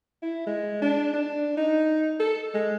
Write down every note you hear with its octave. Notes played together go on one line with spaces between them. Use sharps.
E4
G#3
D4
D4
D#4
A4
G#3